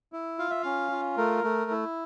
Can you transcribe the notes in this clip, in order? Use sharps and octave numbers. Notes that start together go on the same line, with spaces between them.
E4
F4 F5
E5
C#4 F5
F4
A3 A#4
A3
E4